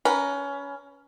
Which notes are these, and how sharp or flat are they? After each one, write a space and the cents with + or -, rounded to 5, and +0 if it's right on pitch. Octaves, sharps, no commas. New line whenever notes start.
C#4 +20 B4 +0 A#5 +0